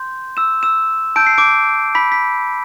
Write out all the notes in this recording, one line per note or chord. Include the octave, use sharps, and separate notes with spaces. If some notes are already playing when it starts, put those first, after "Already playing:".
Already playing: C6 G6
E6 E7
E6 E7
A5 E6 G6 D7
C7
D6 D7
B5 B6
B6